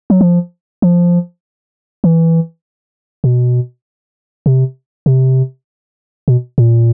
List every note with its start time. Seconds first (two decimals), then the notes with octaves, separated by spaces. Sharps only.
0.10 F#3
0.21 F3
0.82 F3
2.04 E3
3.24 B2
4.46 C3
5.06 C3
6.28 B2
6.58 A#2